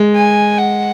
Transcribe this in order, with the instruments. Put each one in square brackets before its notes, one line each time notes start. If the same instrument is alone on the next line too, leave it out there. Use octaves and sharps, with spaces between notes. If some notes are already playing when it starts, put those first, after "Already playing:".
Already playing: [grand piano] G#3
[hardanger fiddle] G#5
F#5